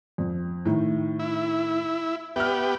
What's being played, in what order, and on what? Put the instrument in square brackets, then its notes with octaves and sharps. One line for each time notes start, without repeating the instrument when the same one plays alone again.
[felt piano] F2
A2 D#3
[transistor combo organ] E4
[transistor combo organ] B3 G4 [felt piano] E5 F6